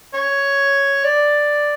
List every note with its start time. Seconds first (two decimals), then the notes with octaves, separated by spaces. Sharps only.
0.14 C#5
1.04 D5